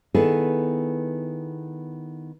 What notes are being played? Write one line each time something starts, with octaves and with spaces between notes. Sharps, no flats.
D#3 B3 E4 G#4 A4 B4